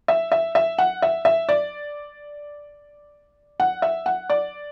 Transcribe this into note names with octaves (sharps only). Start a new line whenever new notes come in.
E5
E5
E5
F#5
E5
E5
D5
F#5
E5
F#5
D5